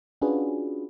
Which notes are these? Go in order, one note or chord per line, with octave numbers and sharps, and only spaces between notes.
C#4 D4 F4 F#4 G#4 B4